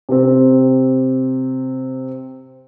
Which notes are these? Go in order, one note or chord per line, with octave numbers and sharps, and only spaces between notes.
C3 C4